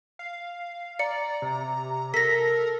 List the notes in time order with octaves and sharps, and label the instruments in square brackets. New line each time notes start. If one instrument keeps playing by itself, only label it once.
[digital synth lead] F5
[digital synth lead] D5 [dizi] A#5 [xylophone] C#7
[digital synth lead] C3
[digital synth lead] A4 [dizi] A#4 [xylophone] A#6 B6